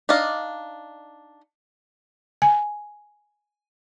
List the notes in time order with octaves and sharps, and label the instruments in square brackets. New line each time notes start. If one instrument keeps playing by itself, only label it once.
[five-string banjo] D4 D#4 D5 D#5 F5
[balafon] G#5